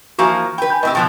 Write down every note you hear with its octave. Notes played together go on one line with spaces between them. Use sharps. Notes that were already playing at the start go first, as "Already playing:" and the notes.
E3 F3 A#3 F#4 C#6
B4 G5 B5
G#5 B5 G6
A2 C4 G4 B4 D#5
B2 F3 B3